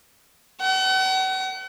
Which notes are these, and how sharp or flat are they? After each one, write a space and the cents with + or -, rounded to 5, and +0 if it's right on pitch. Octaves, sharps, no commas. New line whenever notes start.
F#5 +40